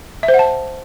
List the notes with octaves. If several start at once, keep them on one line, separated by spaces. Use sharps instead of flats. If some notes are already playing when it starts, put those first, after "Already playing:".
E5
C5
F#5
A5